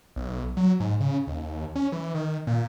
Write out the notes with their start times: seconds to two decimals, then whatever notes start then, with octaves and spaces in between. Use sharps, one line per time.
0.16 B1
0.57 F#3
0.80 G#2
1.00 C#3
1.27 D#2
1.75 C#4
1.92 E3
2.14 D#3
2.47 A#2